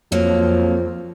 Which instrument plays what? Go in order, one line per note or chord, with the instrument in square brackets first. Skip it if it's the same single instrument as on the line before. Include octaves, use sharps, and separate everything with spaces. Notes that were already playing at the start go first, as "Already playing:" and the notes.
[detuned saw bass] F2 [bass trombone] F3 [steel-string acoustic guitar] F#3 A#3